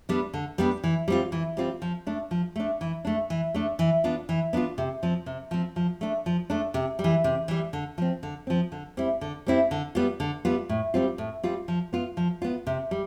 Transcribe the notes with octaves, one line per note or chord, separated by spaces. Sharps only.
G3 B3 D4
D3
G3 B3 D4
E3
G3 C4 F4
E3
G3 C4 F4
F3
A3 D4
F3
A3 D4
E3
A3 D4
E3
A3 D4
E3
B3 D4 F4
E3
B3 D4 F4
C3
F3 C4
C3
F3 C4
F3
A3 D4
F3
A3 D4
C3
G3
E3
C3
E3 G3
D3
F3 C4
D3
F3 C4
D3
G3 C4 E4
D3
G3 C4 E4
D3
G3 B3 F4
D3
G3 B3 F4
A2
G3 C4 F4
A2
G3 C4 F4
F3
B3 F4
F3
B3 F4
C3
G3